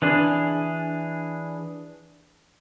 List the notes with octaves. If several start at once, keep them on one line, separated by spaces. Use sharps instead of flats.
E3 D4 G#4